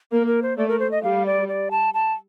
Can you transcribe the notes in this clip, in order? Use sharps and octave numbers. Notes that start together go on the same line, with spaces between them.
A#3 A#4
A#4
C5
A3 D5
A#4
C5
D#5
G3 F5
D5
D5
A5
A5